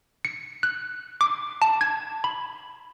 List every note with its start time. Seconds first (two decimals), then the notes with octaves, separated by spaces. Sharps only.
0.25 C#7
0.63 F#6
1.21 D6
1.62 A5
1.81 G#6
2.24 B5